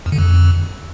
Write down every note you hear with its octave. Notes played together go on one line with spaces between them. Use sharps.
E2
D3
F2